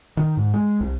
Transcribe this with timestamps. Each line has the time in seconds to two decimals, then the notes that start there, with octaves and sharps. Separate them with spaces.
0.17 D#3
0.37 G#2
0.54 G#3
0.80 C2